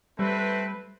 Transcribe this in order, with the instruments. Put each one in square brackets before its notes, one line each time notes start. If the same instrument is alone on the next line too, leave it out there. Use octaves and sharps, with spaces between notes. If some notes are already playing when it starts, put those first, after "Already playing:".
[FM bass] G3 [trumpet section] A3 C4 B4